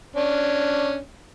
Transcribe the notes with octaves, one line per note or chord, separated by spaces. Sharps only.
C#4 D4